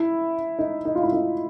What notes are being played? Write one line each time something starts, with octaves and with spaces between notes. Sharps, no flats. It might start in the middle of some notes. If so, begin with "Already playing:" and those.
Already playing: E4
D#4
D#4
F4
E4
D#4